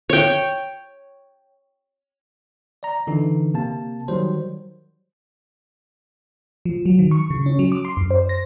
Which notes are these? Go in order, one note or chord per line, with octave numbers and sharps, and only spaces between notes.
C#5 G5
D5 A#5
D3 E3 D#4
C3 A#3 A5
D#3 F#3 G3 C5
F3
F#3
D#3
C#6
C#3
C#4
F#3
D6
C6
F#2
C5
A#6